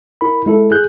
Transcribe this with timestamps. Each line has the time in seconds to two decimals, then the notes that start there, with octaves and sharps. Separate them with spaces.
0.21 E4 A#4 B5
0.46 G#3 E4 A4
0.71 G#4 F#6 G6